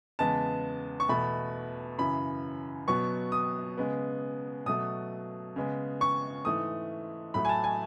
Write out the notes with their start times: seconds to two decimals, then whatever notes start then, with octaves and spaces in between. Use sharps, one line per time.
0.19 E2 C#3 G#3 B3 A5
1.00 C#6
1.09 E2 B2 A3 B5
1.98 F#2 C#3 E3 B5
2.87 B2 F#3 B3 C#6
3.32 D#6
3.78 C#3 G#3 B3
4.66 B2 F#3 A3 D#6
5.56 C#3 G#3 B3
6.01 C#6
6.45 G#2 E3 A3 D#6
7.34 A2 F#3 A3 B5
7.45 G#5
7.49 A5
7.64 G#5